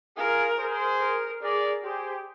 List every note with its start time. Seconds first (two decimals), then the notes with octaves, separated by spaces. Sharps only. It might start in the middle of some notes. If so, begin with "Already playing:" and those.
0.17 F4 G#4 A#4
0.58 G#4 C5
1.01 A#4
1.43 G#4 A#4 D5
1.84 G4 G#4 C5